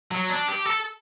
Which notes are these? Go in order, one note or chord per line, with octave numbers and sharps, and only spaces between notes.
F#3
D4
G4
A4